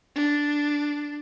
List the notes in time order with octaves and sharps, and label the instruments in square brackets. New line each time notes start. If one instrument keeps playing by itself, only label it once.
[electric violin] D4